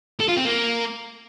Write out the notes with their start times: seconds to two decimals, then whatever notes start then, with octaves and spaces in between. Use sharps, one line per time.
0.20 A4
0.28 F4
0.37 C4
0.45 A#3